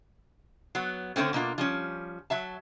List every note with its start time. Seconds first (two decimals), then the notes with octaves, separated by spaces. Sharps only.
0.75 F#3 B3
1.16 D3 G#3 A3 C4 C#4
1.33 B2 A#3 D4 F4
1.58 F3 G3 C#4
2.30 F#3 E5 A5